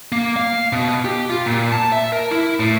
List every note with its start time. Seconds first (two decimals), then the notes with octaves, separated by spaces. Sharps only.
0.12 A#3
0.36 F5
0.73 B2
1.05 G4
1.30 F4
1.46 A#2
1.72 A5
1.92 E5
2.12 A#4
2.31 E4
2.60 A2